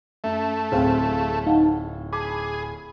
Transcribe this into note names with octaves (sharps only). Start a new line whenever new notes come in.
F#2 A3 C#4 E5
D1 A2 C4 G#4 C5 F5 G5
D#4 F5 F#5 A5
G#4 A5 B5 D6